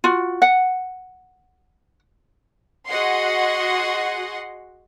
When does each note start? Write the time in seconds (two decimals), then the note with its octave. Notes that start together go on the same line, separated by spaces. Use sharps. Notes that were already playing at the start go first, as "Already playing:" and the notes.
0.04 F4 F#4
0.42 F#5
2.87 F#4 G#4 D#5 F#5 C6